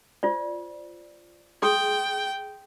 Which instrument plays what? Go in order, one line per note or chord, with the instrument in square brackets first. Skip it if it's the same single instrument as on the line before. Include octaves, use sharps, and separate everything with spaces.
[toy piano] F4 C5 D5
[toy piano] G#4 C6 D#6 [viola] G5